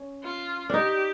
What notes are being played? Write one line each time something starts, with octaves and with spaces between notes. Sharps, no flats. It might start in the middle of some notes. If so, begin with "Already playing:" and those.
Already playing: C#4
F4
D4 D#4 G4